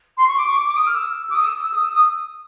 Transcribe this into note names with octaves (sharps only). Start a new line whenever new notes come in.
C6
C#6
D6
C#6
D6
D6
D#6
F6
E6
D6
D#6
E6
E6
D#6
E6
D#6